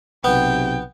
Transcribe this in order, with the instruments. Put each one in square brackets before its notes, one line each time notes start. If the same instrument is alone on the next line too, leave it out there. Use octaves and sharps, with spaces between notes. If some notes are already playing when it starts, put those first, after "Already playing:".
[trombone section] B1 C3 [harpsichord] B3 [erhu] G5